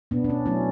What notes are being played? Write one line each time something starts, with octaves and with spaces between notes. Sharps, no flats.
B2 B3 D4
D4
C#4
F#3 A3 C#4 E4